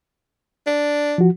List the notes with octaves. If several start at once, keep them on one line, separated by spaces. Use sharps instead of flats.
D4
F3 F#4